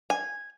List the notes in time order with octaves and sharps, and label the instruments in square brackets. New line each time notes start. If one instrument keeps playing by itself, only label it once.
[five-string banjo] G#5